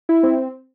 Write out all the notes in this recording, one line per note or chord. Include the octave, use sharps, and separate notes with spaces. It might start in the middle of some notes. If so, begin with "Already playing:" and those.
E4
C4